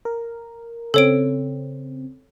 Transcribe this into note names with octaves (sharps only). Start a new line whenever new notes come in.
A#4
C#3 C4 A4 C#5 D7